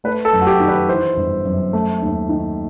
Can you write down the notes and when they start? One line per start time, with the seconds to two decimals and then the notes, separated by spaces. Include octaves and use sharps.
0.04 A3 B4
0.25 A4
0.33 F#2
0.41 F#4
0.47 G4
0.60 D#3
0.68 B4
0.88 E3 C5
1.17 G1
1.45 F#2
1.73 A3
2.02 D#2
2.29 D#3